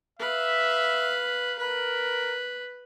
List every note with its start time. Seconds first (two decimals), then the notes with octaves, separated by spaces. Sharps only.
0.20 B4 E5 F5
1.59 A#4 B4